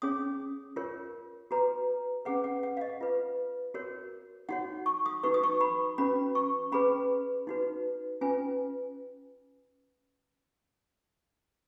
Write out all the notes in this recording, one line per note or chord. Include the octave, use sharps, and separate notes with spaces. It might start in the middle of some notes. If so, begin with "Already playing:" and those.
C#4 G#4 C#5 D#6
F4 A#4 C#5
F#4 B4 A#5
C#4 G#4 B4 F#5
F#5
F#5
F5
D#5
F4 B4
F#4 A#4 C#5
D#4 F#4 C#5 F#5
C#6
D#6
D#4 F#4 B4 C#6
D#6
C#6
B5
C#4 F#4 B4 B5
C#6
C#4 G#4 B4 B5
D#4 F#4 B4
C#4 F4 B4 G#5